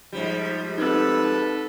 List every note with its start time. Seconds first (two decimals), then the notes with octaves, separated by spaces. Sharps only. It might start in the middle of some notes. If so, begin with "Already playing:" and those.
0.13 G#2 F3 G3
0.78 C4 D#4 A4 B4